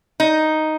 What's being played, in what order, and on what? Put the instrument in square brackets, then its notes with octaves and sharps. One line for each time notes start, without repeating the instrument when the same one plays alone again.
[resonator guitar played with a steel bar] D#4